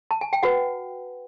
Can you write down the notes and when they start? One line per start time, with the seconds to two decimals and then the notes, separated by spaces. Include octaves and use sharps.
0.11 A5
0.21 G#5
0.33 G5
0.43 F#4 B4 F#5